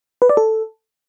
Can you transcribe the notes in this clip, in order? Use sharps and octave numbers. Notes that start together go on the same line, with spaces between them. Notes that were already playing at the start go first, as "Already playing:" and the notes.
B4
D5
A4